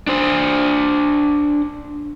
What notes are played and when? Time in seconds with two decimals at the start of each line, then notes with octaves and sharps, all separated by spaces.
0.07 D4 C5